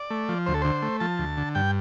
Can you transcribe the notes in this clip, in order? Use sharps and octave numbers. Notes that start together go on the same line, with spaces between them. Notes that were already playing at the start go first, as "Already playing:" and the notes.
Already playing: D5
A3
F3
D2 C5
A4
D3 C5
A3
F3 A5
D2
D3
G2 G5